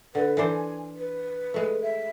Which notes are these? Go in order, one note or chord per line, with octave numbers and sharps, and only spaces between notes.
D3 B4
E3 D4 C5 G#5
B4
G#3 A3
E5